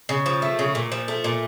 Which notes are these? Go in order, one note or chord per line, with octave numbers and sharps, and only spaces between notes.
C#3
F3
A3
C#3
A#2
F3
A3
A#2